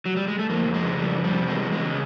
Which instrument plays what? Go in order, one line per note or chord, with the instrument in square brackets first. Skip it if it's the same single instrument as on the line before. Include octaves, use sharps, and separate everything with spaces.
[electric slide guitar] F#3
G3
G#3
A3
F2 A#3
F2
G#3
C#3
F2 G3
F2
G3
C3
E2 G#3
E2
G#3
C#3